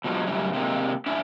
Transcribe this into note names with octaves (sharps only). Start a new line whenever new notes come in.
B2 F3 F#3 G#3
F#2 A2 C#3 G3
C3 G#3 A#3
C#4 D4 E4 E5